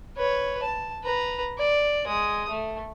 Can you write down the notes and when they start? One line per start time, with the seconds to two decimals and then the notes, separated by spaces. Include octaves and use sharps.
0.17 B4 C#5
0.63 A5
1.04 B4 A#5
1.58 D5
2.07 G#3 D#6
2.49 A3